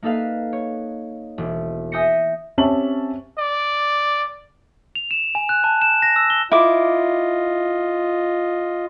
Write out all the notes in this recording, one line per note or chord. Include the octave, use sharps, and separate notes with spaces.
A#3 D#4 A4 B4 F5
C#5
E1
E5 G#5 D#6 G6 A#6 C#7
C4 C#4 G4 E5 A5 F#7
D5
F7
E7
G#5
F#6
A5
E7
A#6
E6
G7
E4 F4 D#5 D6